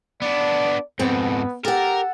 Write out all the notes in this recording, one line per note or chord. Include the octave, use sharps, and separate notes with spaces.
B3 D4 D5
F2 G#2 B3 C4
G4 A4 A#4 F#5